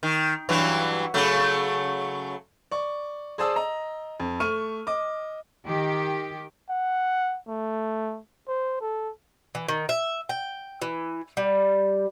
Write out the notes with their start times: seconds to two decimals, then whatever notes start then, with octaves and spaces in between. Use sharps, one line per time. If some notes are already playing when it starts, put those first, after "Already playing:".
0.03 D#3
0.49 G2 E3 F#3
1.14 C#3 F#3 A3
2.71 D5 C#6
3.38 G#4 C5 D5 A5 D#6 E6
3.56 D#5 A#5
4.20 F2
4.40 A3 C#6 F6 D#7
4.87 D#5 D6
5.67 D#3 G4
6.70 F#5
7.48 A3
8.48 C5
8.81 A4
9.55 E3
9.68 D#3
9.89 E5
10.29 G5
10.82 E3
11.37 G3